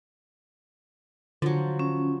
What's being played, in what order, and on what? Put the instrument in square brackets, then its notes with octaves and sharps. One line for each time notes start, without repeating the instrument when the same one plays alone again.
[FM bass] D3 [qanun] F3 F#3
[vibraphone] C#4